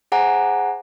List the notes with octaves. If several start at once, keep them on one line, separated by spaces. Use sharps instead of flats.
G#4 C5 F#5 G#5 A#5